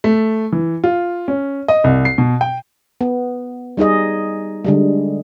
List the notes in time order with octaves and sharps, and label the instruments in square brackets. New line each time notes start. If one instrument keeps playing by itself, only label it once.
[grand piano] A3
E3
F4
C#4
D#5
C2
C7
B2
G5
[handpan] B3
G3 D#4 G#4 D#5
D3 G3 G#3